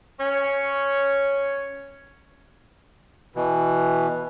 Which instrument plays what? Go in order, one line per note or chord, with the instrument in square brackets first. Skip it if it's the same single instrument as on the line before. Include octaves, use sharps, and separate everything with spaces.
[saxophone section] C#4 C#5
[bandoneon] B2 E3